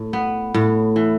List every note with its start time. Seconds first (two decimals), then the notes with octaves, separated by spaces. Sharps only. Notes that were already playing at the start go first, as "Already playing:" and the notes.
Already playing: A2
0.13 B3
0.54 A2
0.96 E3